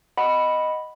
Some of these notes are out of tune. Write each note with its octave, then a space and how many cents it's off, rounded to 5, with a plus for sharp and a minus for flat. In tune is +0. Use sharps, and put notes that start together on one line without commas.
D#5 +0 F#5 +0 B5 +0